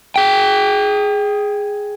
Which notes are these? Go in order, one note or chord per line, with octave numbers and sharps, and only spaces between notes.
G#4 G5